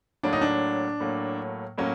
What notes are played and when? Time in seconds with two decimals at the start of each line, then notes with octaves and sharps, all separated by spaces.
0.23 A2 F#3 A#3 D4
0.33 D#4
0.41 D4
1.00 A2 F#3 A#3
1.78 A2 F#3 A#3 C#4